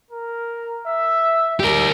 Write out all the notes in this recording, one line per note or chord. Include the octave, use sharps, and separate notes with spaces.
A#4
E5
G3 G4 A#4